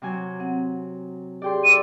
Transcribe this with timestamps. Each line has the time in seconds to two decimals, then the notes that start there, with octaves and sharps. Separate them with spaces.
0.02 C3 F#3 G#5
0.40 C4 F#5
1.42 G4 G#4 D5 G5 C6
1.64 E4 A4 D5 D#7